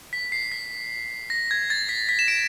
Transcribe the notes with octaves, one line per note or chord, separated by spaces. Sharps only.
B6
C7
B6
A#6
G#6
A6
B6
B6
E7
D7